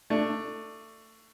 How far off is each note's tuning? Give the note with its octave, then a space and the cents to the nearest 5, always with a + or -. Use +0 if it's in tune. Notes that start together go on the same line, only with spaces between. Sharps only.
A3 +20 D4 +15